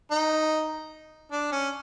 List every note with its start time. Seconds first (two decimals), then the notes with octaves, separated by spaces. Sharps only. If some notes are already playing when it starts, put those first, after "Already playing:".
0.11 D#4
1.31 D4
1.52 C#4